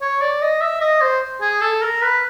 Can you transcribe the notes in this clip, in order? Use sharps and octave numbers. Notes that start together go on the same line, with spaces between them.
C#5
D5
D#5
E5
D#5
C5
G#4
A4
A#4
B4